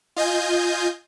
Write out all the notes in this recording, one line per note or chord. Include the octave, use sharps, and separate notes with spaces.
F4 D#5 G#5 G6